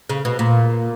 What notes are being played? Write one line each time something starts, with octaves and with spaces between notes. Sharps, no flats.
C#3
B2
A#2